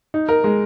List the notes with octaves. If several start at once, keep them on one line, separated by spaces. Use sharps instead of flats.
D#4
A#4
G#3